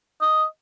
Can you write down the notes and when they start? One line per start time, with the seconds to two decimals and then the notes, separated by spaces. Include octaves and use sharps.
0.21 D#5